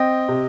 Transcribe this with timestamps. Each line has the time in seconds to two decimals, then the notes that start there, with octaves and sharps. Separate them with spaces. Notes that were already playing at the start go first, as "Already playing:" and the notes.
Already playing: C4 D#5 G5
0.28 C3